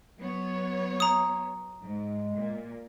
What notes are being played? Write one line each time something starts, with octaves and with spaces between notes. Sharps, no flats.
F#3 B3 C#5
A#5 D#6
G#2 G#3
A#2